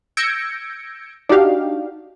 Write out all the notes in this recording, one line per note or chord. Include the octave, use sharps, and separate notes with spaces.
E6 G6 G#6 A#6 C#7 D7
D4 D#4 F#4 G4 F5